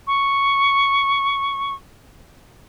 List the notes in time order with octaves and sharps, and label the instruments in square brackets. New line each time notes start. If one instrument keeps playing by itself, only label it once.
[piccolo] C#6